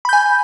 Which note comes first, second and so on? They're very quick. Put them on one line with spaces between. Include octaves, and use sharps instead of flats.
B5 G6 G#5